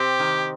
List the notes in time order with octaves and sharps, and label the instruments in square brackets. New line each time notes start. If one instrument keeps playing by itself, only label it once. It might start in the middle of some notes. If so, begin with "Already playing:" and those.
Already playing: [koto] C3 C4 [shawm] G4
[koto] D#3